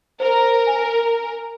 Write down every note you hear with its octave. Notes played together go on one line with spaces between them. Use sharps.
A#4 C5
G#5